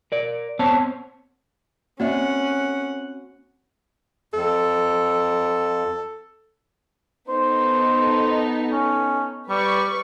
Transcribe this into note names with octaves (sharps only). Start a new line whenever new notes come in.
A#4 D5
B3 C4 C5 C#5 A5
A#3 C4 C#4 F#4 D5 E5 F#5
F2 A4
B3 D#4 A4 C5
C#4
G3 B4 D5 C#6